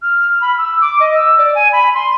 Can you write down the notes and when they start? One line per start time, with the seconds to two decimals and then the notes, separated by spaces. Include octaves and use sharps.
0.02 F6
0.41 B5
0.58 E6
0.81 D6
1.00 D#5
1.14 E6
1.38 D5
1.55 G#5
1.72 B5
1.95 C6